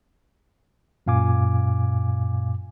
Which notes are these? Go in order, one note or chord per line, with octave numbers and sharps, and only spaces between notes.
F#2 A#2 F5 G#5 D6